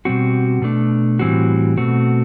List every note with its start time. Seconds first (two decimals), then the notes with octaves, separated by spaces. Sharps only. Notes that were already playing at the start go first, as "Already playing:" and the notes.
0.05 B2 G3 C4 F#4
0.62 B2 A3 D4
1.19 A2 E3 G3 C4 F#4
1.78 B2 A3 C4 F#4